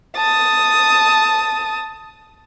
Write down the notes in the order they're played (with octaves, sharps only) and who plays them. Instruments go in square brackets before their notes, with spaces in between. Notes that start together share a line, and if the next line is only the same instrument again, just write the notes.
[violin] A5 D#6